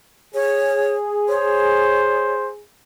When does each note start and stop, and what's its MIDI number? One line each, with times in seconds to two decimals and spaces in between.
0.35 2.62 68
0.35 0.96 73
1.29 2.51 72
1.29 2.34 73